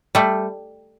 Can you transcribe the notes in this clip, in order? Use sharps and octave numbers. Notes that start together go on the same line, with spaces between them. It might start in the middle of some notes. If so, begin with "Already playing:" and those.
G3 A3